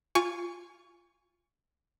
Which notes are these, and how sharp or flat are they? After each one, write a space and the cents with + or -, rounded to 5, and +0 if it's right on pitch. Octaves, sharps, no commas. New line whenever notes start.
F4 +0 G#5 -15 C#6 +20